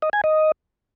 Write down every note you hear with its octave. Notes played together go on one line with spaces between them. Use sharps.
D#5
G#5
D#5